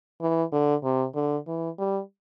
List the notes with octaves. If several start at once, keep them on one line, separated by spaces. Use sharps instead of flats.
E3
D3
C3
D3
E3
G3